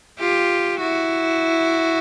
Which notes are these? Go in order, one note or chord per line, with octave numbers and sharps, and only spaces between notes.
F4 G4
E4 F#4